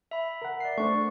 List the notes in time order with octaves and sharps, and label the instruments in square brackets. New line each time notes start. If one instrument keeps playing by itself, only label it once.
[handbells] E5 B5
[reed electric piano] A#4 F#5
[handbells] D5 C7
[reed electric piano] A3 D4 C5 [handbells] C#6